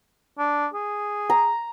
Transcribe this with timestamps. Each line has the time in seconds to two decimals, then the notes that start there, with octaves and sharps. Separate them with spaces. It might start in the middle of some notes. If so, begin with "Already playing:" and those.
0.39 D4
0.74 G#4
1.30 A#5